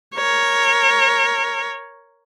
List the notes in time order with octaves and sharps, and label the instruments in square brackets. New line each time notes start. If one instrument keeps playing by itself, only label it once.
[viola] A#4 C#5